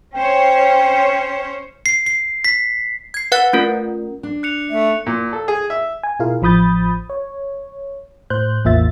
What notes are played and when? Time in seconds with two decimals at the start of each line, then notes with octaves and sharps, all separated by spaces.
0.15 C#4 C5 C#5 G5
1.86 C7
2.06 C7
2.44 B6
3.14 G#6 C7
3.32 B4 F5 F#5 F#6 A6
3.53 A3 C#4 F4 A#4
4.23 D4
4.43 F#6 C#7 F7
4.70 A3 E5
5.06 A#2
5.33 A4
5.48 G#4
5.70 E5
6.04 G#5
6.19 B2 E4 F4 G#4 A#4 F5
6.42 A1 F3 B5 D#6 G6 A6
7.10 C#5
8.30 A2 C5 F#6 G6
8.64 A1 E2 A#3 F4 E5 A6